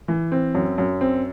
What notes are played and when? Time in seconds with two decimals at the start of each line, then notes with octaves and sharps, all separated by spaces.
0.08 E3
0.32 C4
0.55 F#2
0.78 F#2
1.01 C4